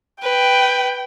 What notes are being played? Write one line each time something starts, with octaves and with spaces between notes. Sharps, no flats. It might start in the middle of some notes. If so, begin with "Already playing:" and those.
B4 G5